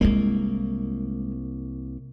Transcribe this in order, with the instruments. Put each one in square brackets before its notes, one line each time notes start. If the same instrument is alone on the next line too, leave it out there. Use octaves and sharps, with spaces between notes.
[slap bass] C2 A#3 [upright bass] G#3 E4